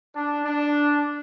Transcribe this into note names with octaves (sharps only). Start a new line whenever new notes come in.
D4
D4